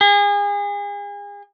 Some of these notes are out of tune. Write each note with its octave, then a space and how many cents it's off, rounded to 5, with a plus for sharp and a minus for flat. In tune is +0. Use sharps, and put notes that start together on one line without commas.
G#4 -35